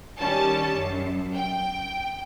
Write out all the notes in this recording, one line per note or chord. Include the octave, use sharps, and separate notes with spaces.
D#3 G3 C#4 A5
F#2
G5